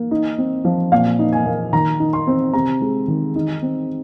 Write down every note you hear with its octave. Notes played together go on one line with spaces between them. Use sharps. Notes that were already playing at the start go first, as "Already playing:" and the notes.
Already playing: A#3
D#4
C4
F3
A#2 F5
D#4
G#5
A#3
D#3 A#5
D#4
C6
C4
C3 A#5
G#3
D#3
D#4
C4